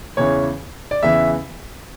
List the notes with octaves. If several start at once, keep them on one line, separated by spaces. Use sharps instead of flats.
E2 C#3 E3 C#5
D5
E2 C#3 E3 E5